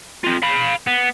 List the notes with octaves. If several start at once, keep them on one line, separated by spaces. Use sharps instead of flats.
C4 F4
F5 B5
B3